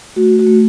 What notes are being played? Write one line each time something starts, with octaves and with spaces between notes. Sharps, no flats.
A3 F#4
F#4
A3